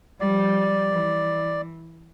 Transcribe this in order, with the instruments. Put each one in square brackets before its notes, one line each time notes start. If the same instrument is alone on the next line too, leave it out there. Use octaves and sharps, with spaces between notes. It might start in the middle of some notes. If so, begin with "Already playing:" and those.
[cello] F3 G3 [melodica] D5
[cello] E3